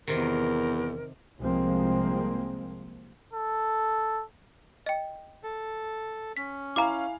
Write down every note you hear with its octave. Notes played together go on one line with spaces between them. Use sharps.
E2 C3 D#3 A#4
C2 C3 F3 G#3 A#3 C4
A4
D#5 G5
A4
C#4 B6
E4 F5 G#5 A#5 D6